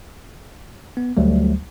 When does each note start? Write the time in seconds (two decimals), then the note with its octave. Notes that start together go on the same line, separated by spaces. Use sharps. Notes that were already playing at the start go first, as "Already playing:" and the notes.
0.97 B3
1.17 D2 F#3 G3 A3